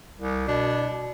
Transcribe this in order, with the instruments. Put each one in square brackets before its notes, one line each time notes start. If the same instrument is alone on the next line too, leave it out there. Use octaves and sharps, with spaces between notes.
[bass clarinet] C2
[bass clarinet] B2 [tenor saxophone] D4